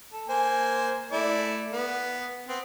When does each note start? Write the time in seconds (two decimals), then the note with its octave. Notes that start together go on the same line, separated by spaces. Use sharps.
0.13 A4
0.29 A#3 C5 G#5
1.12 A3 E4 D5
1.73 B3
2.48 B3 C4